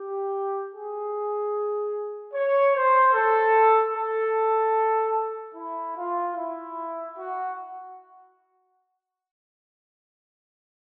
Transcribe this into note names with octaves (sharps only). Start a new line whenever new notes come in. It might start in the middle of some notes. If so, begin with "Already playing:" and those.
Already playing: G4
G#4
C#5
C5
A4
A4
E4
F4
E4
F#4